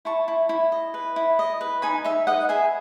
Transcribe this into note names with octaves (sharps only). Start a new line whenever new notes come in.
E4 A5 C#6
E4
E4
D#5
B4
E4
D#5
B4
D#4 G#5 B5
D#4 E5
B4 D#5 F#5
G#4 E5 G#5